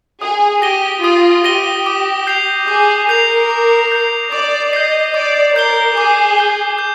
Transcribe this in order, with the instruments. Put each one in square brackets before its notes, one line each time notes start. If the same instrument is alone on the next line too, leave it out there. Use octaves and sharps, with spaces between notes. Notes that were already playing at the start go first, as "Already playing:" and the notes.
[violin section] G#4 [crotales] D#6
[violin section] G4 [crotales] A#6 D#7 G7
[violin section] F4 [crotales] D#6
[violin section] G4 [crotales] A#6 D#7 G7
[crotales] D6
G6 C7 F7
[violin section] G#4 [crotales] D6
[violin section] A#4 [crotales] G6 C7 F7
[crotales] D6
G6 C7
[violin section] D5 [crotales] D6
[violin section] D#5 [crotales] G6 C7
[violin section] D5 [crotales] D6
[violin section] A#4 [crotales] G6 C7 G7
[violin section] G#4 [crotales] D6
[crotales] G6 C7 G7
G6